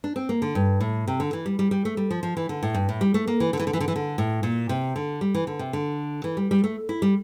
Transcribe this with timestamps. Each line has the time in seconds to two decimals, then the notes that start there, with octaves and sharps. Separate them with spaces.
0.04 D4
0.16 C4
0.29 A#3
0.42 D3
0.55 G2
0.81 A2
1.07 C3
1.20 D3
1.33 E3
1.46 G3
1.59 G3
1.71 G3
1.85 A3
1.97 G3
2.10 F3
2.23 F3
2.37 E3
2.49 D3
2.63 A2
2.75 G2
2.89 A2
3.01 G3
3.14 A3
3.27 A#3
3.40 E3
3.53 D3
3.59 E3
3.67 D3
3.73 E3
3.80 D3
3.88 E3
3.96 D3
4.18 A2
4.43 A#2
4.69 C3
4.96 D3
5.21 G3
5.34 E3
5.47 D3
5.59 C3
5.73 D3
6.24 E3
6.37 G3
6.51 G3
6.64 A3
6.89 E4
7.02 G3